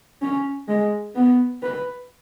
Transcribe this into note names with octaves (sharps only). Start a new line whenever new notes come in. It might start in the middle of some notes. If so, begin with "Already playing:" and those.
C#4
G#3
B3
B4